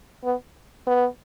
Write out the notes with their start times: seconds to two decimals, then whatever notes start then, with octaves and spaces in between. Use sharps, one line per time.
0.24 B3
0.87 B3